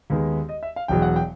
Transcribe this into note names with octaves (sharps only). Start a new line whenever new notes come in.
D#2 D#3 G#3 B3
D#5
E5
F5
E1 E2 B2 F#3 G5
F#5
G5